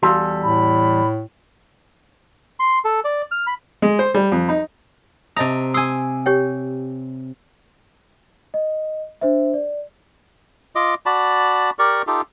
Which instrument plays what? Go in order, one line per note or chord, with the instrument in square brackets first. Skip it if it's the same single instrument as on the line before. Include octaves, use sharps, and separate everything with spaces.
[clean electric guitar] E2 G3 A4 [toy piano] F#4 F5
[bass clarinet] A2 [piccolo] B5
[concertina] C6
A4
D5
F6
B5
[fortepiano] G#3
C5
G3
F2
D#4
[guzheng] C3 A#5 [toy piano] D#5 A5 D#6
[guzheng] G#5 C6 [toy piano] D#6 E6
[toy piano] G4 C#5 G5
[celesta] D#5
D4 C5 E5
D5
[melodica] F4 D#5 D6
F#4 D5 A5 B5
G4 A#4 D5 C#6
D#4 F4 G4 A4